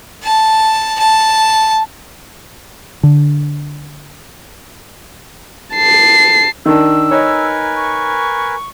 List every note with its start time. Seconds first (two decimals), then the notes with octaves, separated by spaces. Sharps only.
0.24 A5
0.99 A5
3.03 D3
5.75 A5 C7
6.66 D#3 D4 E6
7.11 D#4 A#4 B4 C#5 G#5
7.76 C#6